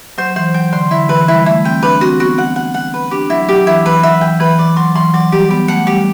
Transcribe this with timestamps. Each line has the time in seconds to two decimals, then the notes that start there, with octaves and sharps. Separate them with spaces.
0.18 F#3 C5
0.36 E3 C5
0.54 F#3 G5
0.73 D3 C6
0.91 D3 E4
1.09 E3 B4
1.28 G3 E4
1.46 A3 E4
1.65 C4 G5
1.82 D4 B4
2.01 C4 F#4
2.20 B3 F#4
2.38 B3 F#5
2.56 F#5
2.74 F#5
2.94 B4
3.11 D4 G4
3.30 F#3 E4
3.49 F#3 G4
3.66 E3 E4
3.85 E3 B4
4.03 F#3 E5
4.21 E3 G5
4.40 E3 B4
4.59 E3 D5
4.76 F#3 C6
4.95 E3 C6
5.14 F#3 D5
5.32 G3 G4
5.51 B3 G4
5.68 A3 F#5
5.87 G3 G4